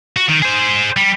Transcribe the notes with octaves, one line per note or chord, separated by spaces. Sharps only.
F#4
D#3
G#4 C5
G3